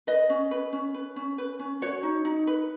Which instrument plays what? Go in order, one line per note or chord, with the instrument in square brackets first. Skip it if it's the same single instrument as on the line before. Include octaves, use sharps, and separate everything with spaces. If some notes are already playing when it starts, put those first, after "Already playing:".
[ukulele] B4 D#5
C#4
B4
C#4
B4
C#4
B4
C#4
F#4 C#5
D#4
D#4
B4